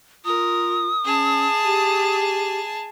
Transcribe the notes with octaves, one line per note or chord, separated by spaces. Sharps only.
F4 A#4 D#6
C#4 G#4 A5
G4